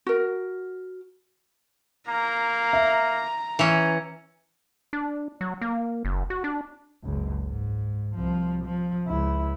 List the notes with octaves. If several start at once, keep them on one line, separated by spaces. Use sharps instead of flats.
F#4 A#4
A#3 A#5
E5
E3 C#4
D4
F#3
A#3
F#1
F#4
D4
F#1 C#2
G#2
C2 F3
F3
C#2 E4